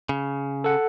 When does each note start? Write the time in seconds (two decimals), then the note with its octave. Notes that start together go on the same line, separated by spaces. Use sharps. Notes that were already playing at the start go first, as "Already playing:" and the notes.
0.09 C#3
0.64 A4 F#5